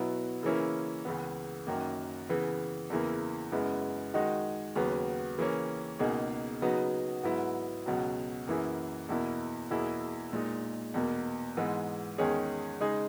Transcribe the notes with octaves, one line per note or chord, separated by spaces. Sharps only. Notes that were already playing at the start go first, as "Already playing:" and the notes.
Already playing: B2 F#3 B3 E4
C#3 E3 A#3 C#4 E4
C#2 C#3 E3 B3
F#2 D#3 F#3 A#3
C#3 E3 B3
E2 C#3 E3 A#3 E4
F#2 C#3 G#3 B3 E4
D#3 G#3 D#4 F#4
D#2 C#3 F#3 B3
C#3 E3 A#3 C#4
C#2 B2 A#3 D#4 G#4
C#3 F#3 B3 D#4 F#4
G#2 F#3 B3 E4
C#2 B2 F#3
F#2 E3 A#3 E4 G#4
E2 B2 A#3 E4
E2 B2 A#3 E4 G#4
A#2 G#3 D#4
E2 B2 A#3
G#2 E3 G#3 B3
E2 D#3 G#3 C#4 G#4
C#3 G#3 D#4 G#4